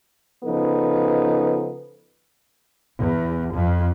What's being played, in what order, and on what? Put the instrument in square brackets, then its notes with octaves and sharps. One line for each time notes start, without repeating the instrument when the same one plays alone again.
[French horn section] C#3 F3 B3 D#4 A4 B4
[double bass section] E2
F2